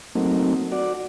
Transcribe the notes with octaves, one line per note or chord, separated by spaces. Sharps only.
F#3 A3 A#3 C4 D#4
F#4 D5